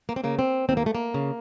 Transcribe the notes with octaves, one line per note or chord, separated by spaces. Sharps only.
A#3
C4
C#3 A#3
C4
D#2 C4
A#3
A3
A#3
C#3